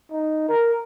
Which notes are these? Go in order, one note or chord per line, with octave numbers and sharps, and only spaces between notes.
D#4
A#4